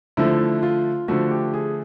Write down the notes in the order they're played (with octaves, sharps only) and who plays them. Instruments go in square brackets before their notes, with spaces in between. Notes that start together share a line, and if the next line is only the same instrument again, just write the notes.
[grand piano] D3 F3 A3 E4
F4
D3 F3 A3 F#4
G4
G#4